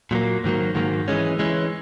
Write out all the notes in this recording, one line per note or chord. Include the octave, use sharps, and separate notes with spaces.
A#2 F#3 A#3
G#2 D#3 F#3 A#3
G#2 D#3 F#3 A#3
E3 G#3 C#4
E3 G#3 C#4